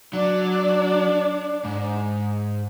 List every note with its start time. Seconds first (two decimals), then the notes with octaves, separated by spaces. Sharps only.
0.13 F#3 D4 D5
1.65 G#2